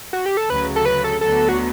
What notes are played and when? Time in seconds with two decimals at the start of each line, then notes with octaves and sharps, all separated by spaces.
0.13 F#4
0.26 G4
0.37 A4
0.49 D2 C#3 F#3 B4
0.76 A4
0.85 B4
1.04 A4
1.21 D2 D3 F#3 B3 A4
1.49 F#4